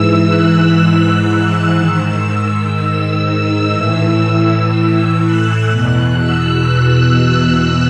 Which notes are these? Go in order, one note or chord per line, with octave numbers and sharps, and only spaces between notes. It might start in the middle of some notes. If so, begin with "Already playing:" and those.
Already playing: G#2 E3 E6
F#6
E6
G#2 D#3
E6
E6
A2 E3
E6
E6
F#6
E2 B2
E6
F#6